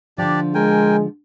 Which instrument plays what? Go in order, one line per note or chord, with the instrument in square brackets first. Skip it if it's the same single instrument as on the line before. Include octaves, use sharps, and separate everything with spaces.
[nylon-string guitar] D3 F3 [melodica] D4 G4 D5
[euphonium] G#3 [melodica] A#4 G5 G#5